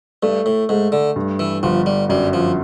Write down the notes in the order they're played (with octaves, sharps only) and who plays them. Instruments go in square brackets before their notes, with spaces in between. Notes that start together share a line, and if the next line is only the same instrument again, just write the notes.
[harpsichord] G2 [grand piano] A3
[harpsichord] A2
[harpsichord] G#2 [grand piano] A3
[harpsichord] D3
[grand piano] G2
[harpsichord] E3
[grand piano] G1 [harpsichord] F3
[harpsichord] G3
[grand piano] F#2 [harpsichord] G3
[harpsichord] F3